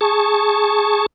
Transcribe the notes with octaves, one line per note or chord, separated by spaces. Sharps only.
G#4 A5 C#6